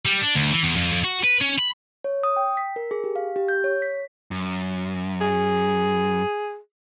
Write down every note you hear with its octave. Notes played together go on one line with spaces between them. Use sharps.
G3
D4
D2
E3
E2
F2
F2
F#4
B4
C#4
B5
C#5
D#6
G5
B6
A#4
G#4
G4
F5
G4
G6
C#5
B6
F#2
G#4